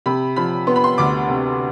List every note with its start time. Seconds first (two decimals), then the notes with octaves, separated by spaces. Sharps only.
0.06 C3 B5
0.36 F3 B5
0.67 B3 C6
0.76 B5
0.84 C6
0.98 D2 D6
1.29 C3